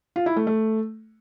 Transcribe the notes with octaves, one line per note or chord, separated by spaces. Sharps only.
F4
E4
A3
A3